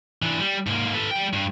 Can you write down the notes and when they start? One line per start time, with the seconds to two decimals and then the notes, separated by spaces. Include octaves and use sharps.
0.22 E3 D4
0.40 G3
0.67 G#2 A#3
0.94 A4 B4
1.11 G3 G5
1.33 G2